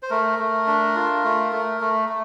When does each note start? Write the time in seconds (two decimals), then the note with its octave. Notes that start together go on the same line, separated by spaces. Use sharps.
0.03 C5
0.10 A3 A#4
0.39 A3
0.67 D4
0.95 F4
1.24 A3
1.52 A3
1.81 A3
2.09 A3